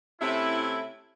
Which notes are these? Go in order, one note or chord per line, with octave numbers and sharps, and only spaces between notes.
C3 A3 C#4 E4